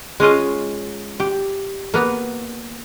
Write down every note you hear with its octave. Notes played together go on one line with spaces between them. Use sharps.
G#3 C#4 F4 D#5
G4
A#3 B3 A#5